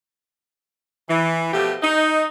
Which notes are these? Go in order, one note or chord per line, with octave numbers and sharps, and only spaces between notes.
E3
B2 F3 A3 G4
D#4